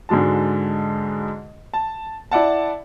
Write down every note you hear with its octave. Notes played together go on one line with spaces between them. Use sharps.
G#2 D3 G#3 F#4 A5
A5
E4 D5 F#5 A5